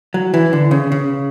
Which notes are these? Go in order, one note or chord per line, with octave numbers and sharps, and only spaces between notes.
F#3
E3
D3
C#3
C#3